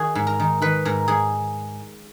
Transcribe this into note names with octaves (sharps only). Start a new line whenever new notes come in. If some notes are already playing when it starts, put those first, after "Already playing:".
Already playing: D#3 F#4 G#4
G#2
A#4
D#3
D#3 B4
G#2 A#4
G#2 G#4